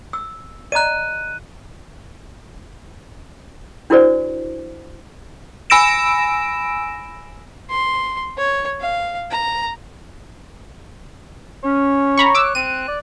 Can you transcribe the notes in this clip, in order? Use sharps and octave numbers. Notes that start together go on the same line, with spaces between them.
E6
D5 D#5 A#5 F#6 D#7
D4 E4 F#4 A#4 C5 D5
G#5 B5 E6 A#6 D7 E7
C6
C#5
F5
A#5
C#4 C#5
A#5 B5 C#6
D6 E6 F#6
C4 D#7
D5